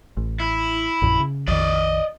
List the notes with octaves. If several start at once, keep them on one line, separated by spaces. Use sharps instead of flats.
A1
E4
A#1 F#2 A#2
C#3
A#1 F2 D#3 D5 D#5